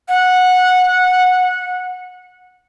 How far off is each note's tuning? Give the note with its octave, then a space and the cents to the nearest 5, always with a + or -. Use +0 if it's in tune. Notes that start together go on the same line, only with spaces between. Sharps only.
F#5 -15